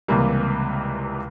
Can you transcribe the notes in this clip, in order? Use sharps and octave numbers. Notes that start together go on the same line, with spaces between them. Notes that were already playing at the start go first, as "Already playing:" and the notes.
C#2 C3 E3 G3 A#3